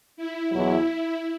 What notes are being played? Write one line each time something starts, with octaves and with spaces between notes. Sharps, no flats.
E4
E2 B2 F#3 E4